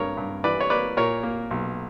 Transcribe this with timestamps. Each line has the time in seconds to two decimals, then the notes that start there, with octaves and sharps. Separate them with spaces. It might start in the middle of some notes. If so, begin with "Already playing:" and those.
Already playing: G2 A#3 A#4 C#5
0.17 G2
0.44 E3 B4 D5
0.61 C#5
0.70 A#3 B4 D5
0.97 A#2 A#4 C#5
1.23 A#3
1.51 B1